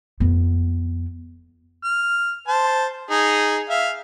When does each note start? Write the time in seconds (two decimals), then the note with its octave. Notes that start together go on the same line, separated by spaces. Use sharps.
0.20 F2 B3
1.84 F6
2.48 C5 A5
3.11 D#4 G#4
3.70 E5 F5